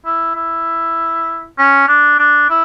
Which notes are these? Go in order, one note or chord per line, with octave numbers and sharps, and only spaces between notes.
E4
E4
C#4
D4
D4
E4